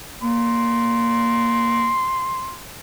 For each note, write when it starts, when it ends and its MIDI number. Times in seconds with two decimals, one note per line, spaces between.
0.23 1.91 58
0.23 2.59 84